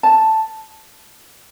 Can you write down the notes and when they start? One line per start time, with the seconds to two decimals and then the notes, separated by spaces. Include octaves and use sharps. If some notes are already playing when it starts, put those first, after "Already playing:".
0.03 A5